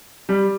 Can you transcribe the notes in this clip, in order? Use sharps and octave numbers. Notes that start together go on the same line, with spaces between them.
G3